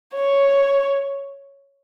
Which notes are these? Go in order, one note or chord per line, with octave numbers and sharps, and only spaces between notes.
C#5